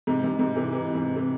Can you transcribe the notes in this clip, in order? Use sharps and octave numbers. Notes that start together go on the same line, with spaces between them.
G#2 C3
G#2 C3
G#2 C3
C3 E3
C3 E3
G#2 C3
C3